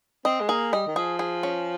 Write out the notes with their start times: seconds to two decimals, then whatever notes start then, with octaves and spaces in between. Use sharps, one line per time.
0.25 C4 D#5
0.41 G#3
0.49 A#3 G#4
0.73 G3 D#5
0.87 D#3
0.96 F3 G#4
1.19 G#4
1.43 C#4